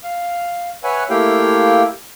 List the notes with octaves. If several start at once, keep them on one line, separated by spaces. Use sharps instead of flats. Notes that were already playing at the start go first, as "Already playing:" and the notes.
F5
B4 C#5 E5 F#5 G#5
A3 A#3 E4 G4 F5 G5